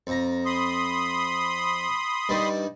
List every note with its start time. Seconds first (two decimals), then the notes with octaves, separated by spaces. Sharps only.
0.07 F2 A#5
0.46 B5 C6 D#6
2.29 G2 D#3 G3